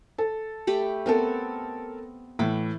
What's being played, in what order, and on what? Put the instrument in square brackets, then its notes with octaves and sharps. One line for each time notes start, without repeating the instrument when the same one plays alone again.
[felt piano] A4
[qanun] A3 G4 B5
[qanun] B3 C4 [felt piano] A4 A#4
[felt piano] A2 [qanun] E3 B5 D6